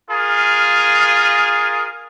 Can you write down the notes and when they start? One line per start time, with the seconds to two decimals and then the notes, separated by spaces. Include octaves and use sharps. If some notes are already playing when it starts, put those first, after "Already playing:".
0.11 F4 G#4 A#4